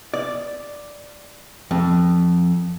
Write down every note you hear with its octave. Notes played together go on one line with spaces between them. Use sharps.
D5
F2